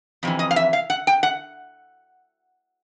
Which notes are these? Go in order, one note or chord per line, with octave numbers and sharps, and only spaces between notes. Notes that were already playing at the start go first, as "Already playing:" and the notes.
F2 C3 E3
D#5
F5
E5
F5
F#5
G5
F#5